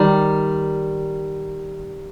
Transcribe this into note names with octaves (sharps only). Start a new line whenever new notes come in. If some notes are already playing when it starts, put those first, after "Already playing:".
Already playing: D#3 G3